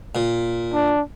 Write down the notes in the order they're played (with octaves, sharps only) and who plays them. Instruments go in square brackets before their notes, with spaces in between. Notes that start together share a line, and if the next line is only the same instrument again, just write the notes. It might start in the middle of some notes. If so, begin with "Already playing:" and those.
[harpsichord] A#2
[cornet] D4